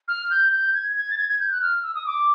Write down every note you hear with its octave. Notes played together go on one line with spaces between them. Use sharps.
F6
G6
G6
G#6
G#6
A6
G#6
G#6
G6
F#6
F6
E6
D#6
D6